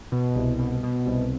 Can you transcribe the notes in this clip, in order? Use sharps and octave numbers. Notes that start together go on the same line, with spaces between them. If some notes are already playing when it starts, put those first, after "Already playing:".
B2
C2
B2
B2
C2